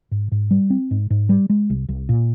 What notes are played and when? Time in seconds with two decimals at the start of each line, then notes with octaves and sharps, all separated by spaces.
0.11 G#2
0.32 G#2
0.51 G3
0.70 C4
0.91 G#2
1.10 G#2
1.29 G3
1.49 G#3
1.70 C2
1.89 C2
2.09 A#2